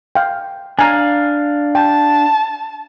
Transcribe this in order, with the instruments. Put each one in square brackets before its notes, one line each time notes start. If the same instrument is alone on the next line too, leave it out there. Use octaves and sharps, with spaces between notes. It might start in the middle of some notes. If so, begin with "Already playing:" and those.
[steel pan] F5 G5
[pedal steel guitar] D4 F5 [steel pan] G#5 A#5
[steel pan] G5 [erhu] A5